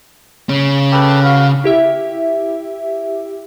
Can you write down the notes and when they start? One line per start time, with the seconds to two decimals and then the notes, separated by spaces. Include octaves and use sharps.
0.49 C#3 C#4
0.93 G4 A4 B4
1.23 F#4 F5
1.64 E4 G4 E5